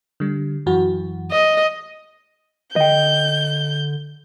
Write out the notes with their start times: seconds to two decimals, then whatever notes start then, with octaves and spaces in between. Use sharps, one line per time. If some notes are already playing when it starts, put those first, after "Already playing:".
0.20 D3 G3
0.66 F#2 E3 F#4
1.32 D#5
2.76 D3 D#5 G5 G6